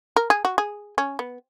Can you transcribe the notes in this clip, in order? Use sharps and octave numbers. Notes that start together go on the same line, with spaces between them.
A#4
G#4
F#4
G#4
C#4
B3